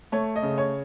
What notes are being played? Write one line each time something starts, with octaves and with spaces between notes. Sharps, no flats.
A3 C#5
D#5
C#3
C#5